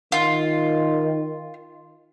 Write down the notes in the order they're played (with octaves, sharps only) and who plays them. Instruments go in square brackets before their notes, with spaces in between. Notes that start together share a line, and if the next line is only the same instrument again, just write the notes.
[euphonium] D#3 [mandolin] F4